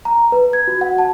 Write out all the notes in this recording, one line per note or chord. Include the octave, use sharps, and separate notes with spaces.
A#5
B4
G#6
F#4
F#5
A5